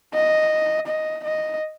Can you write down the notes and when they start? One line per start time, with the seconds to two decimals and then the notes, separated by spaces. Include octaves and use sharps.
0.14 D#5
0.87 D#5
1.24 D#5